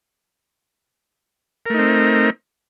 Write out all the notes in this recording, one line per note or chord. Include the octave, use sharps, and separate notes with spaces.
A3 C4 D#4 A#4